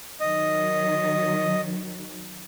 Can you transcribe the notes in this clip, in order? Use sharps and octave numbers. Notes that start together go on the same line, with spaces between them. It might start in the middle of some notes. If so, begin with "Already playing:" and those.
D#3 F#3 D#5